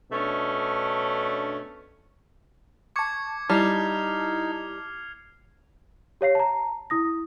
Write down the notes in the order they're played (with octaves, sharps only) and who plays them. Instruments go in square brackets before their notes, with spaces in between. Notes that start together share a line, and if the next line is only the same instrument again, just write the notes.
[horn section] B2 A3 C#4 D4
[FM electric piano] A5 C#6 [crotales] D6 G#6 C#7
[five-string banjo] G3 [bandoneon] D#4 [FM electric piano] E4 A5 [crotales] F6 C7 F7
[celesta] G4 C#5 F5 C7
A5 A#5
E4 D#6 A#6